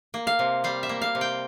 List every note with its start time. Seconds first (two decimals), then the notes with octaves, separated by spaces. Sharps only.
0.14 A#3
0.27 F5
0.39 C3
0.64 G3 F5
0.83 E5
0.89 A#3
1.02 F5
1.15 C3
1.21 G5